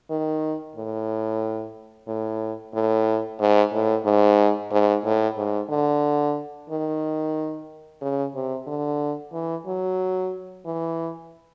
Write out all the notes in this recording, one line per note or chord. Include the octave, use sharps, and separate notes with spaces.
D#3
A2
A2
A2
G#2
A2
G#2
G#2
A2
G#2
D3
D#3
C#3
C3
D3
E3
F#3
E3